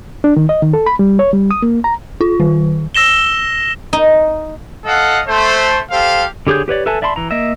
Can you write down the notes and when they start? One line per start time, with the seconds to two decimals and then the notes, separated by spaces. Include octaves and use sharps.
0.24 D4
0.36 D#3
0.49 D#5
0.62 D#3
0.73 A4
0.86 B5
0.99 G3
1.19 C#5
1.33 G3
1.51 D#6
1.62 A#3
1.84 A#5
2.21 F4
2.40 D#3
2.95 E6 A#6 E7 G7
3.93 D#4
4.84 A4 D#5 F5 F#5
5.27 A3 C5
5.91 G4 A4 C5 F5
6.47 D3 G4 G#4 C#5 G6
6.68 G4 B4 C#5 D5
6.86 A4 B4 E5 G#5 A5
7.02 D5 E5 A5 B5 C6
7.16 E3 A#5
7.31 A#3 D#5 E5